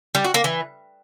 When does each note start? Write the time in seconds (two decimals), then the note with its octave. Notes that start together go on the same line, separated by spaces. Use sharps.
0.15 G3
0.24 F#4
0.34 A#3
0.44 E3